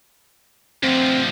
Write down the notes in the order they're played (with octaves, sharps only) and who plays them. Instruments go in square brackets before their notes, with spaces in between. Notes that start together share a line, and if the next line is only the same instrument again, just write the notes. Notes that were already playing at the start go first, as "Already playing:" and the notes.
[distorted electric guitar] D2 F3 [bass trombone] C4